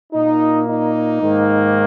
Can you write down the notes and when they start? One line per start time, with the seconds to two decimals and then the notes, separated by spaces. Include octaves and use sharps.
0.13 A#2 A#3 D#4
0.67 D#4
1.21 G#2 D#3 A#3